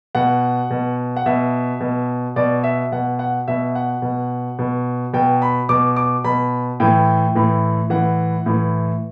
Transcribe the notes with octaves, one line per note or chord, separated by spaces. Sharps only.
B2 F#5
B2
F#5
B2 E5
B2
B2 D5
E5
B2 F#5
F#5
B2 E5
F#5
B2
B2
B2 G5
B5
B2 D6
D6
B2 B5
A2 E3 G5
A2 E3
A2 E3 F#5
A2 E3